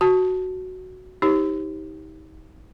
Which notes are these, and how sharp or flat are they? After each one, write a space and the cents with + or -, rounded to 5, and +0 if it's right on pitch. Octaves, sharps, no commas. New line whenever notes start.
F#4 +0 A5 +0
D#4 +30 G4 +0 C5 +35